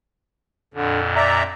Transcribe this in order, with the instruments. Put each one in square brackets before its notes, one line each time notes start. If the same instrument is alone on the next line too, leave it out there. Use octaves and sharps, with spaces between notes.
[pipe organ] F2 A#2 [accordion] D3
[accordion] D5 E5 A#5